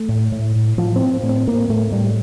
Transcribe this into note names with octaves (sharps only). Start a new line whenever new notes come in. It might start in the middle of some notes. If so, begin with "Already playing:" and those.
Already playing: A3
A2
A2
A2
A2 F3
C4
A2
A2
C4
A2 A#3
A2 A3
A2 G3